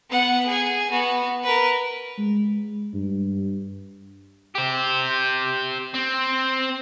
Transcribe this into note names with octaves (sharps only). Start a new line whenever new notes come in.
B3 F#5
G#4 G#5
B3 F#4
A#4 B4
G#3
G2
G4 C5
C4